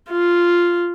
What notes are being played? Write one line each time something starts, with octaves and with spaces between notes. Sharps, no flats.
F4